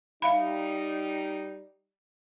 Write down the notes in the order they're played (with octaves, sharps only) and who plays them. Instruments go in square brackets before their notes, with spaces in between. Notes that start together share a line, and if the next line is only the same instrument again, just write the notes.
[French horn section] G3 D#4 [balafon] E5 F5 B5